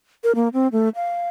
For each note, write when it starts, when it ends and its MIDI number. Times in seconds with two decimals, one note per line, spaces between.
0.24 0.32 70
0.35 0.48 58
0.53 0.68 60
0.72 0.89 57
0.95 1.29 77